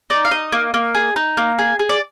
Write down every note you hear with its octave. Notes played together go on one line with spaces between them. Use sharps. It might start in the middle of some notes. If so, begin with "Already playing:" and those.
D#4 D5
F5
D#4 D#5
A#3
A#3
G#4
D#4
A#3
G#4
G#4
D5